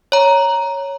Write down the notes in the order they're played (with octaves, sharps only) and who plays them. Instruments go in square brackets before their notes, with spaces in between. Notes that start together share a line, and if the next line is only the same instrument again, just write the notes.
[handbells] C#5 A#5